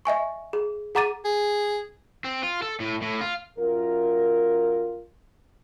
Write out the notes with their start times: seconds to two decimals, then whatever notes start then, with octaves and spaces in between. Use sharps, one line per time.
0.05 D#5 E5 G#5 C#6
0.53 G#4
0.95 G#4 F#5 A#5 D6 A6 D#7
1.25 G#4
2.24 C4
2.43 F4
2.62 A4
2.80 A2
3.02 A2
3.21 F4
3.58 F#2 F4 A#4